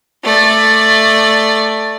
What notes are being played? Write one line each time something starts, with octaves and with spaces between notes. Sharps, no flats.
A3 D5